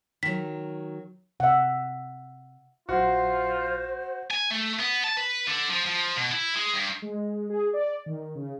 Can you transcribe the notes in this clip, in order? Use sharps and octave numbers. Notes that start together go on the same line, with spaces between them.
D#3 F#3 B6
C3 E5 F#5
A#1 F#3 F4 F#4 C5
G#5
A3
B3
A5
B4
D3
F3
F3
B2
E4
G#3
G2
G#3
G#4
D5
D#3
C#3